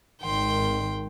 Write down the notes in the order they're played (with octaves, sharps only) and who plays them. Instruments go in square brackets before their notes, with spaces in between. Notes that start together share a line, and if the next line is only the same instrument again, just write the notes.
[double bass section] G#1 D#3 [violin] G5 C6